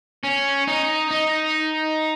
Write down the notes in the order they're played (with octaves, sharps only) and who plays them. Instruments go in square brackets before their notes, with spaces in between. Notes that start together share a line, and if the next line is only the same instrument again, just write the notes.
[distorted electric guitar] C#4
D#4
D#4